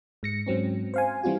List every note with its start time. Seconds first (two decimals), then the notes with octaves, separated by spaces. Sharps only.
0.23 G#2 A#6 C#7
0.46 G#2 F#3 C4 C#4
0.94 C5 F5 G#5
1.23 E3 G3 C4 F4 F#4